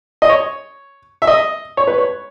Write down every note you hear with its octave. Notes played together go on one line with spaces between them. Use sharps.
D#5
C#5
E5
D#5
C#5
B4
C#5